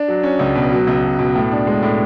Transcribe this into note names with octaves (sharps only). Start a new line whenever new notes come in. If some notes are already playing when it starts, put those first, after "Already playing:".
Already playing: D4
F#3
C#4
C#2
B2
F#3
C#2
B2
B2
A2
D4
G#3
A2